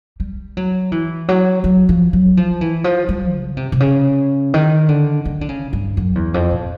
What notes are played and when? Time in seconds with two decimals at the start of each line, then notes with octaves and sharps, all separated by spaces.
0.20 G3
0.57 F#3
0.92 E3
1.28 F#3
1.64 F#3
1.89 F3
2.13 F#3
2.37 F3
2.61 E3
2.84 F3
3.09 G3
3.33 C#3
3.57 C3
3.72 C3
3.80 C#3
4.54 D#3
4.88 D3
5.25 D#3
5.41 D3
5.49 C#3
5.73 G2
5.97 F#2
6.15 E2
6.34 F2
6.51 A#2